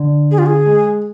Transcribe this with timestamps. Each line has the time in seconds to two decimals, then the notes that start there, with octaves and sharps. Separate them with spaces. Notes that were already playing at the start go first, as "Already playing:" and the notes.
Already playing: D3
0.31 G#4
0.39 F4
0.46 G#4
0.66 G#3